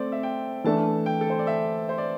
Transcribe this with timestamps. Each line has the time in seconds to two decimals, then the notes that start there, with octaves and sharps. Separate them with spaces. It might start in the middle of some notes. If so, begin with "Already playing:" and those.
Already playing: A3 C4 C5 D5
0.12 E5
0.23 G5
0.64 E3 A3 D4 A5
1.06 G5
1.21 A4
1.30 C5
1.39 D5
1.47 E5
1.89 C5
1.98 D5